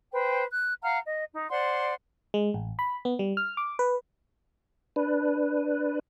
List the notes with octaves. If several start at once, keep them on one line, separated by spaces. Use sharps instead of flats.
B4 C5 G5
F#6
F5 F#5 A#5 F6
D#5
D#4
C5 D5 F#5 C6
G#3
A1
B5
B3
G3
F6
D6
B4
D4 B4